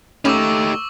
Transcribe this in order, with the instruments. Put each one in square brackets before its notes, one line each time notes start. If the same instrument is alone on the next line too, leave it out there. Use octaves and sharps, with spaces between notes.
[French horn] A3 [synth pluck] C#4 B5 [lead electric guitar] D#4 G4 [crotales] C#6 D6 E6